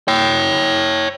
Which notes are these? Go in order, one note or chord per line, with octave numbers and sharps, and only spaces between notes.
C#5 G5